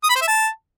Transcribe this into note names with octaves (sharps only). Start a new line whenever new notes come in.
D#6
B5
C5
E5
A5